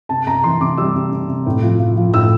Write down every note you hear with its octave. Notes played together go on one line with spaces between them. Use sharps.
C3 A5
C3 A#5
E3 C6
C3 D6
G3 E6
C3
C3
C3
A2
F3
F3
F3
A2 E6